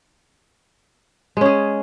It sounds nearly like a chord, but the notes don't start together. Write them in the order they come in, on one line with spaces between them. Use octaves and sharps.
G#3 C#4 G#4